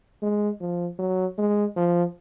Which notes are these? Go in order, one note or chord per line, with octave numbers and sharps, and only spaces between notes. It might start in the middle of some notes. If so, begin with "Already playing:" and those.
G#3
F3
F#3
G#3
F3